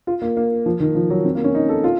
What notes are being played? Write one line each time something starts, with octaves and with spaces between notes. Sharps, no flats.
F4
A#3
A#3
F3
D#3
F3
F#3
C4
A#3
C#4
D#4
A4
F4